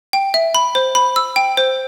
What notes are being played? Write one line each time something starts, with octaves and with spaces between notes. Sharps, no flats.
G5
E5
B5
C5
B5
E6
G5
C5